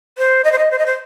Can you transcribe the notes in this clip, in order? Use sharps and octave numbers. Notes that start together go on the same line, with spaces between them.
C5
D#5
C5
D#5
C5
D#5
C5